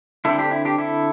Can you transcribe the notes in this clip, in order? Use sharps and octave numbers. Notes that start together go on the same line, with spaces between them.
D3 C4 E4 A4
D4 G4
E4
D4 G4
E4 A4